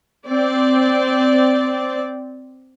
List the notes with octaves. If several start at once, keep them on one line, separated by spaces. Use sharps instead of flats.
C4 D5